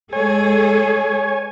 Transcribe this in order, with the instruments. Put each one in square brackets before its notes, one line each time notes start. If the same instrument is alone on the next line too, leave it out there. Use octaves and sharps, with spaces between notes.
[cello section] G#3 G#4 A4 [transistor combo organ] C#5 G#5